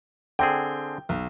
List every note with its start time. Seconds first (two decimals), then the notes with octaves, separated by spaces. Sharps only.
0.39 D3 C4 G#4 G5
1.09 B1